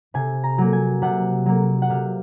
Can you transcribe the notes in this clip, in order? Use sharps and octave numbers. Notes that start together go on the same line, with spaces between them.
C3 G#5
A#5
F#3 A#3
G#5
C3 F#5
F#3 A#3
F#5
C3 F5